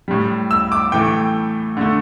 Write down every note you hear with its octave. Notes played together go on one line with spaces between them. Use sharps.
A2 G3
E6
D6
A2 E3 A3 G5
D3 A3